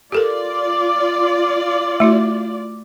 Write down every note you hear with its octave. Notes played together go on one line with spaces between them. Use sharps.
F4 G4 A4 A#4 D5
A3 E4 F#4